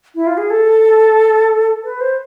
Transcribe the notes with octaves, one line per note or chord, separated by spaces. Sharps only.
E4
F4
G#4
A4
B4
C5